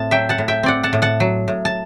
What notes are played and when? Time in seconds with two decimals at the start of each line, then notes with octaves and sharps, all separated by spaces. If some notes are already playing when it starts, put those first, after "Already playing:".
Already playing: A2 C4 A5
0.11 F#3 E5 G5
0.29 F#5 A5
0.38 A2
0.48 E5 G5
0.63 C4 D5 F#5
0.83 F#5 A5
0.93 A2
1.02 F#5 A5
1.20 F#3
1.48 A2
1.65 A5